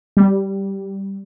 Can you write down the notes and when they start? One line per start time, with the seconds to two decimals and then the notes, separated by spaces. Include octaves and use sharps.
0.17 G3